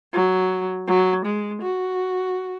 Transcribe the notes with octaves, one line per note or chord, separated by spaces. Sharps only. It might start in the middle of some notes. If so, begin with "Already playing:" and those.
F#3
F#3
G#3
F#4